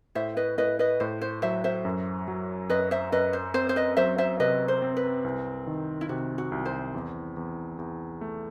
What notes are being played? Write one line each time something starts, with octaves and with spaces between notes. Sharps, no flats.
A2 C5 E5
B4 D#5
A2 B4 D#5
B4 D#5
A2 C5
C5
F#3 C5 E5
C5 E5
F#2
F#3
F#2 B4 D#5
C5 E5
F#2 B4 D#5
C5
C4 C5
C5
B4 D#5
F#3 C5 E5
C5 E5
C3 B4 D#5
C5
C4
B4
C2
D#3
E4
C3 F#4
F#4
C2
C5
E2
E2
E2
A3